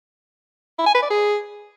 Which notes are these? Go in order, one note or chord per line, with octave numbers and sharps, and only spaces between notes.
E4
G#5
B4
D5
G#4